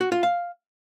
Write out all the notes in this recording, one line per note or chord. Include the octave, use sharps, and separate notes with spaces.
F#4
F4
F5